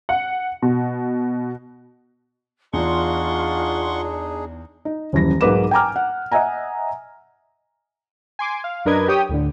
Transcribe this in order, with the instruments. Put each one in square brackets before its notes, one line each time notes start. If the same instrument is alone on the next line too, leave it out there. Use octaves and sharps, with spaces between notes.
[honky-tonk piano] F#5
B2
[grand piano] E2 [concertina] D4 D#4 G#4 [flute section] F4 [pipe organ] F#5 C6 C#6
[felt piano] D#4
D#1 F#2 E3 A#6
B1 G#2 A#4 B4 D6 E7
G5 G#5 A#5 D6 F6
F#5
D#5 E5 F#5 G#5 A#5
[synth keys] G#5 C6 D6
F5
F#2 D4 A#4 B4 D#5 G#6
G4 C#5 G5 D#6
D2 A2 D3